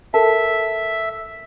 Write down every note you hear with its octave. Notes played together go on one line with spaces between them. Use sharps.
A4 A#4 E5 A5